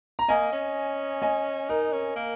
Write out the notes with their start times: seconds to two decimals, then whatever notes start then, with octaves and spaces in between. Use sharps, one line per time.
0.19 A#5
0.28 A#3 D#5 G#5
0.52 C#4
1.22 D#5 G#5
1.69 D#4 A#4
1.92 C#4
2.16 A#3